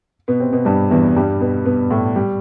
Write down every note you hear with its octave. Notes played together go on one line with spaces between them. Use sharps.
B2 B3
C3 C4
B2 B3
G2 G3
E2 E3
G2 G3
B2 B3
B2 B3
A2 A3
G3